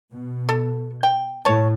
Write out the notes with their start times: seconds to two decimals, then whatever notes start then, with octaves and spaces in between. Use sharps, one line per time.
0.12 B2
0.49 A4
1.03 G5
1.45 A2 C#5 A5